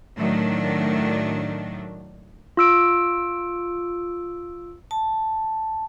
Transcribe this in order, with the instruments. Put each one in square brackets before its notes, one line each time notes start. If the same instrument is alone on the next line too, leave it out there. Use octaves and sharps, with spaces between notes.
[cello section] A2 D#3 F#3 A3 D4
[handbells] F4 E6 D7
[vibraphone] A5